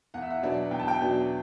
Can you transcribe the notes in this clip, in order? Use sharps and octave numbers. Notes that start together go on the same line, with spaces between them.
E2 F#5
E5
F#5
B2 F#3 B3 D4
E2 G5
A5
G5
B2 F#3 B3 D4